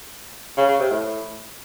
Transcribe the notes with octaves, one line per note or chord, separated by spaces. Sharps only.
C#3
C#3
C3
A2